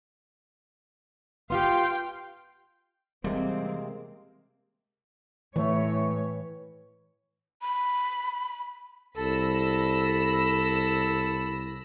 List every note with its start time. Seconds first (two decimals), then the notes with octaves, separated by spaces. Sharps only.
1.50 B3 F4 G4 F5 G5 C6
3.24 C3 E3 G3 G#3 A#3 C4
5.56 A2 E3 A3 C#5
7.62 B5
9.17 C2 A4 B5 E6 A#6